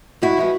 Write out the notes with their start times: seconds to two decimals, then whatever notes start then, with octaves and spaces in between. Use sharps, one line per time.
0.22 G#2 E4 F#4
0.37 F3 G#3 B3